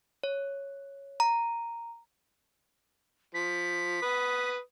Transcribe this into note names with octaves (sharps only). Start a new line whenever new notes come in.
C#5
A#5
F3 B6
B4 D#6